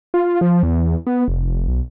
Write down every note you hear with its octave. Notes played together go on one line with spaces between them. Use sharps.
F4
F3
E2
B3
F1
B1